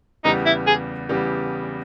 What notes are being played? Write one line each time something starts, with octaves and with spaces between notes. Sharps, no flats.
E2 C#3 G3 B3 D#4 G4
E4
G#4
E2 C#3 G3 B3 G4